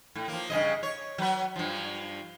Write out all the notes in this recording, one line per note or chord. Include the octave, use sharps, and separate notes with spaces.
A2
F3 A#3
G2 C#3 D#5
C#5
F#3 B4
G2 F3